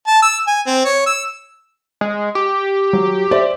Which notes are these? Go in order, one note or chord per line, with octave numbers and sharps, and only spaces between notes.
A5
E6
G#5
C4
C#5
E6
G#3
G4
F#3
C5 D5 E5